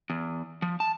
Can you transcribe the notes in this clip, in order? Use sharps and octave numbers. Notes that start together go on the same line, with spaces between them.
E2
F3
A5